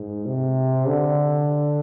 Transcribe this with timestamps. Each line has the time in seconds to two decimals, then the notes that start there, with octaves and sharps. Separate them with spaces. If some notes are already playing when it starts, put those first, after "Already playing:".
Already playing: G#2
0.26 C3
0.88 D3